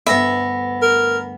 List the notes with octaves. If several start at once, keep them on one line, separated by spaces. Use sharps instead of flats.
D2 G2 B3 E5 B5 A#6
A#4